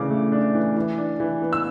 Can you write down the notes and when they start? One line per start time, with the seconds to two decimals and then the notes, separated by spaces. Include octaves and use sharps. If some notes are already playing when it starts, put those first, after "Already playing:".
Already playing: C#3 E3 A3 D4 D6
0.11 A3
0.32 D4
0.55 E3
0.76 E3
0.98 D4
1.20 E3
1.42 B3
1.53 E6